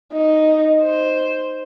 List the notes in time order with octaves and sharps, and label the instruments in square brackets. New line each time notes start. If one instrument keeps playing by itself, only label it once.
[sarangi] D#4
C5